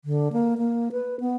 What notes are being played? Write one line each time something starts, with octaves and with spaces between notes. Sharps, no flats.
D3
A#3
A#3
B4
B3